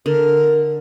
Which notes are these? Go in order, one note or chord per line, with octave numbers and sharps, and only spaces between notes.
D3 A#4